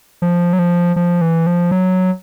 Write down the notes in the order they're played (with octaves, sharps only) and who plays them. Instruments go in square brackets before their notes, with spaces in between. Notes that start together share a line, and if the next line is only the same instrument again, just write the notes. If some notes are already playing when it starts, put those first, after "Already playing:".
[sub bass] F3
F#3
F3
F3
E3
F3
F#3